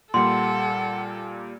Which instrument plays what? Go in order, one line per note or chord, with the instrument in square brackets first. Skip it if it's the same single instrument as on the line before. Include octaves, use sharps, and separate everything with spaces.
[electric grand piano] A#2 G3 A#3 [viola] A4 [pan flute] F#5 [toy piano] C6